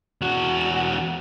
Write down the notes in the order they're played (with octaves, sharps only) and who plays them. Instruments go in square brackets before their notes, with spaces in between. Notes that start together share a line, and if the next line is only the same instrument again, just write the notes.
[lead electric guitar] E2 F#4